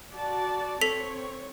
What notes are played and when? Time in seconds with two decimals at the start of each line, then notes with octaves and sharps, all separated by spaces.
0.13 F#4 D5 A5
0.81 C4 A4 C#5 B6 F7